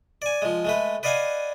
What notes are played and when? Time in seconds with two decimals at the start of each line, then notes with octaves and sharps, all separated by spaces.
0.22 D5 G#5
0.42 F3 G#3
0.65 G#3 A3 B4
1.03 B4 D5 D#5 F5 F#5 G#5